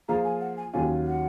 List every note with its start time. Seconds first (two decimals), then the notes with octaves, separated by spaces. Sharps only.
0.08 F3 A#3 F4 G#4 A#5
0.25 G#5
0.41 F#5
0.57 G#5
0.73 D#2 D#3 F#3 C#4 F4 G#5
1.06 F#5